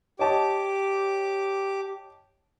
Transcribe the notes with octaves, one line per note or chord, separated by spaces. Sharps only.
G4 C#5 D#5 A5 D6